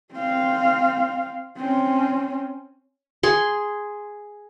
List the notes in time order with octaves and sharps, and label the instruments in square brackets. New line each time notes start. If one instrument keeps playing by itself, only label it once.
[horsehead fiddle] C4 F5
C4 C#4
[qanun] G#4 C6